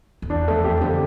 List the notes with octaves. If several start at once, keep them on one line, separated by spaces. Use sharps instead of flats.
F2
E2 D4
F2 A3
E2 G4
F2 D3